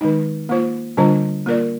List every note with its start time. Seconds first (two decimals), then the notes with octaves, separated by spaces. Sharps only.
0.01 D#3 G#3 D#4
0.49 A#3 F4 C5
0.97 D3 G3 D4 F4 C5
1.46 A#3 F4 A#4 D5